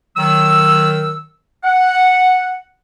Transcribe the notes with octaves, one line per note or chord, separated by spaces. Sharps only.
D#3 F#3 E6
F#5